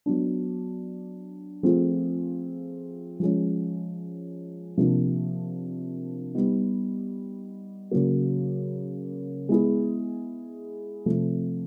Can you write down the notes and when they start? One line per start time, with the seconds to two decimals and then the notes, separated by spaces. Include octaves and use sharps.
0.06 F#3 B3 D4
1.63 F3 A3 C4 F4 G#4
3.20 F3 G#3 C#4
4.77 C3 F3 A#3 D4
6.35 G3 B3 D#4
7.91 C#3 F#3 A#3
9.49 G#3 B3 E4 G#4
11.06 C3 F3 A3 C4